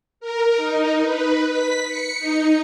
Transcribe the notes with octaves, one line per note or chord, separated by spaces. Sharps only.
A#4
D#4
B4
B6
C#7
D#4